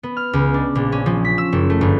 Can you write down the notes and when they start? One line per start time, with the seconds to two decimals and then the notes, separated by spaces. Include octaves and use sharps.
0.03 B3
0.17 F6
0.33 C#2
0.54 D4
0.75 A#1
0.92 C#4
1.06 F3
1.25 B6
1.38 E6
1.52 F#1
1.70 A3
1.81 G1